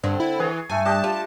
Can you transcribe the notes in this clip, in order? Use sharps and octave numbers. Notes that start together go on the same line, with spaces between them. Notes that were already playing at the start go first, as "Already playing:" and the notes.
G2 D3 C4
E4
E3 G#4 C#6
G2 A3 G#5 A5
D4 G4 D#5 A5
G3 F4